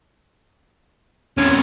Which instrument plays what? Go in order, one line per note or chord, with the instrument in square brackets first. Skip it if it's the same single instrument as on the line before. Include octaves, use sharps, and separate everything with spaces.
[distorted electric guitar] E2 C3 [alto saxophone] C#4